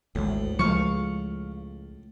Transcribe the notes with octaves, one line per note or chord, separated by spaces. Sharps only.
G#1 D2 A2 G#3
C#2 F3 G#3 A3 F5 C#6